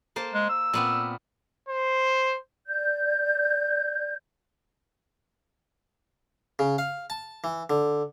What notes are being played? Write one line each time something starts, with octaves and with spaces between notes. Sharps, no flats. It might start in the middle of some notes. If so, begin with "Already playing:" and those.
A#3 C5 A5
G#3
E6
A#2 B3 C4
C5
D5 G6
C#3
F5
A5
E3
D3